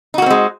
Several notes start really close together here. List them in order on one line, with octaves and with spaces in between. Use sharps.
D#4 F#4 A#3 C4 G#3